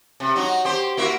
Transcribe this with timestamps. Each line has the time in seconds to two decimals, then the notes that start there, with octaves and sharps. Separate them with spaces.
0.20 C3
0.36 F#3 D#4 F#4
0.65 G4 C5
0.97 A#3 E4 F#4